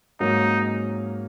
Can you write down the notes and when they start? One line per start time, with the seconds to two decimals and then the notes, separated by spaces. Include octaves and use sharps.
0.20 G#2 F#3 A#3 C#4 D#4